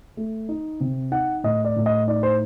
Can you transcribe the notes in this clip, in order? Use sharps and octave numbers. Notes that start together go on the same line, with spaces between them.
A3
D#4
C3
D#4 F#5
A2 D#5
D5
A2
D#5
D#4 D5
C5